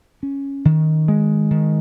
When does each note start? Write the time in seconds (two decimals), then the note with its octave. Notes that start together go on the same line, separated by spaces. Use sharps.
0.23 C#4
0.65 D#3
1.08 G#3
1.51 D#3